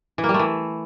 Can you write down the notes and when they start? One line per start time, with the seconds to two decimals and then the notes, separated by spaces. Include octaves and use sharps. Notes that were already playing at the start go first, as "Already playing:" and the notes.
0.18 E3
0.23 A#3
0.29 G3
0.34 A3
0.39 E3